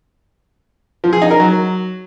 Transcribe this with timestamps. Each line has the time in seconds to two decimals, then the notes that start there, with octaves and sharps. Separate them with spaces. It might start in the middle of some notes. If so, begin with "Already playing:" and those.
1.04 F3
1.13 G#4
1.22 D#4
1.31 A#4
1.40 F#3